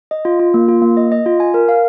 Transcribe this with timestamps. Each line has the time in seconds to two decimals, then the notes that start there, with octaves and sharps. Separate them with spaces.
0.11 D#5
0.25 F4
0.39 F4
0.54 A#3
0.68 F4
0.82 A#3
0.97 D#5
1.12 D#5
1.26 F4
1.40 G#5
1.54 A#4
1.69 F5